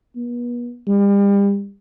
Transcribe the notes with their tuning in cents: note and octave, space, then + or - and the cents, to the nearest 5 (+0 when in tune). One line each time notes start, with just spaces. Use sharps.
B3 -40
G3 +35